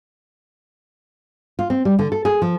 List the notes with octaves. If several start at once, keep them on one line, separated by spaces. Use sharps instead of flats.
F4
C4
G3
D3
A4
G#4
F3